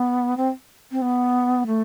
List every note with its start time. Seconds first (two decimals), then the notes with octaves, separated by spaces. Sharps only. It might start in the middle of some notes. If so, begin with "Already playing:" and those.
Already playing: B3
0.37 C4
0.92 C4
1.02 B3
1.67 A3